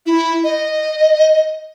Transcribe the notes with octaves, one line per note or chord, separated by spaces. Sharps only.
E4
D#5